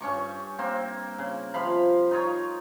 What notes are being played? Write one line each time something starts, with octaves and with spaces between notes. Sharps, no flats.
G2 C#4 C#6 D6
A#3 C4
C#3
C3 F3 F5 B5
D#4 F4 A#4 C#5